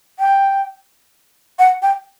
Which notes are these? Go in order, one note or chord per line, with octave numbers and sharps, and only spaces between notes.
G5
F#5
G5